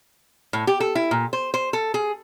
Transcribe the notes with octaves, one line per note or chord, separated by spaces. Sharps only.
A2
G4
A4
E4
A#2
C5
C5
A4
G#4